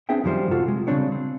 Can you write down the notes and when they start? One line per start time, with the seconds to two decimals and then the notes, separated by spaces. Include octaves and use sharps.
0.09 B3 C4 D4 G#4 E5 G5
0.24 F#2 D#3 F3 G3 C5
0.51 C3 F4 F#4 A4
0.66 C3 G#3
0.87 C#3 G3 G#3 C4 D4 C#5
1.12 C4